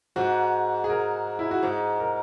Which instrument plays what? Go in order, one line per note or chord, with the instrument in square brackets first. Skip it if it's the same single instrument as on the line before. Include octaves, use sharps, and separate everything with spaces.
[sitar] G#2 [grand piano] F#4
[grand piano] G#4
A#4
E4
F#4
[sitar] G#2 [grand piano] G#4
[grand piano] A#4